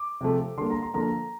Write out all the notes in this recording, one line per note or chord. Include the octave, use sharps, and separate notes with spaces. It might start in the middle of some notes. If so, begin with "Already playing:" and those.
Already playing: D6
C3 F3 A3
D3 G3 A#3 C6
A#5
C6
D3 F3 A#3 A#5